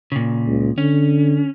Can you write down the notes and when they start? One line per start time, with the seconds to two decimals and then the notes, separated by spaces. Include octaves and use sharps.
0.12 A#2 C#3
0.47 C#2
0.78 D3 C#4